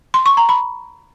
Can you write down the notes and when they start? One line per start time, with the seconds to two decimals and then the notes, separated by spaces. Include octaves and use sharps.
0.14 C6
0.26 C#6
0.37 A#5
0.49 B5